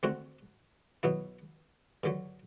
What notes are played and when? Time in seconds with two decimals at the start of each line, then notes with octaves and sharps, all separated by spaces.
0.03 D3 A3 C4 F#4
1.03 B2 F#3 B3 E4
2.03 G2 D3 F#3